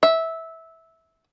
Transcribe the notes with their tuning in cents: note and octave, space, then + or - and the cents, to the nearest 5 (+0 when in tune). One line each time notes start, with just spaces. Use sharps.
E5 -15